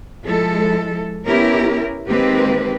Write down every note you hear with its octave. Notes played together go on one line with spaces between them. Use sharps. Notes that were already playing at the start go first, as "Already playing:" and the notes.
F3 G#3 E4 A4
B3 C#4 E4 G4 A#4
D#3 G#3 A#3 C4 G4 B4